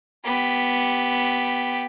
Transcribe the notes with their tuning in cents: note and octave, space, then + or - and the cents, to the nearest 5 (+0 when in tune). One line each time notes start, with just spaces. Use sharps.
B3 +0 G4 +0